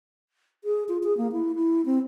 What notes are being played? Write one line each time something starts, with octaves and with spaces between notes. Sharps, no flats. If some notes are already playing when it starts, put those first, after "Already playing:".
G#4
F4
G#4
A#3
E4
E4
C4